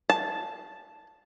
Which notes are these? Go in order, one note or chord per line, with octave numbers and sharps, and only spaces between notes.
A5